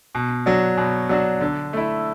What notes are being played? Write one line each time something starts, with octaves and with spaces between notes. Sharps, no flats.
B2
F#3 D4 F#4
B2
F#3 D4 F#4
D3
A3 E4